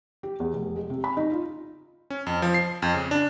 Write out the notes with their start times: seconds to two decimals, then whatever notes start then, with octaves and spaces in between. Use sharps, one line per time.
0.23 G4
0.40 E2
0.53 F1
0.76 G#3
0.90 C3
1.04 B5
1.17 D#4
1.32 F4
2.10 C#4
2.27 F2
2.42 F3
2.54 C7
2.82 F2
2.94 C#3
3.11 D4